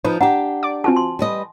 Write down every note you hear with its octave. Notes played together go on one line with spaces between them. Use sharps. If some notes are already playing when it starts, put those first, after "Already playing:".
F3 D#4 B4
D4 G4 F#5 A#5
D5 D6
C4 F4 F#4 G#5 A5
C6
G3 B4 D#5